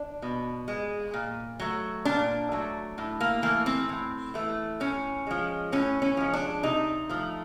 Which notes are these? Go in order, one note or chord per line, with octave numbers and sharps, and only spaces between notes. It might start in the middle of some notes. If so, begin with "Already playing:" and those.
Already playing: D4
B2
G#3
A#2
F#3 A3
A#2 D4
F#3 A3
A2
A#3
E3 A3 A#3
C4
A2
E3 A3
A2 C#4
F3 G#3
A2 C#4
C#4
F3 G#3
D4
C3 D#4
F3 A3